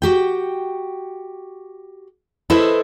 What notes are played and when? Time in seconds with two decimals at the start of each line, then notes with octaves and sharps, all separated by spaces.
0.02 F#4 G4 G5
2.50 E4 A4 B4 C5 D#5 E5